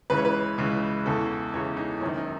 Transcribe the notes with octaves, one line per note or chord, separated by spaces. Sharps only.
C#2 C#3 E3 B4
C#5
B4
C#2 C#3 E3
E2 C#3 E3 A4
E2 C#3 E3 C#5
D#4
F#1 F#2 D#3 C#4
D#4